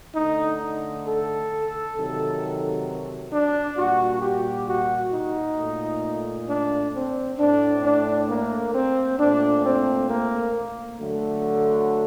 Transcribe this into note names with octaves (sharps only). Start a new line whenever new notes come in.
D3 A3 D#4
A4
C3 D#3 F#3
D4
A#2 G3 F#4
G4
F#4
D#4
A#2 A3
D4
C4
A2 A3 D4
D4
A#3
C4
A#2 A3 D4
C4
A#3
D3 F#3 A3